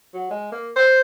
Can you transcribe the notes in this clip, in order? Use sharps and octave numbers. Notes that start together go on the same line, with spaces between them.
F#3
G#3
A#3
C5